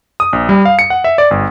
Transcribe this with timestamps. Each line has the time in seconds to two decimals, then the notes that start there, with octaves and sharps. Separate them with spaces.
0.20 D#6
0.33 A#1
0.49 G3
0.65 F5
0.79 C#7
0.90 F#5
1.04 E5
1.18 D5
1.31 G1